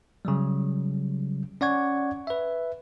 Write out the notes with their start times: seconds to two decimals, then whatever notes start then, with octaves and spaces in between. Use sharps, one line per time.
0.25 C#3 F#3 G3
1.61 C#4 D5 F#5 C#6 G#6
2.27 B4 E5